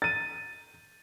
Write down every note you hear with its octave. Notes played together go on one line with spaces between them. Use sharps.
A6 D#7